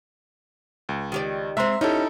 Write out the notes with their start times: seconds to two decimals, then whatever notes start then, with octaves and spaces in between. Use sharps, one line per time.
0.89 C#2
1.12 D#3 G4 D5
1.57 G#3 C4 E5 A#5 C6
1.81 C#4 D#4 E4 G4 A4